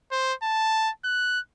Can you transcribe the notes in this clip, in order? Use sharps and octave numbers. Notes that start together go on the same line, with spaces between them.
C5
A5
F#6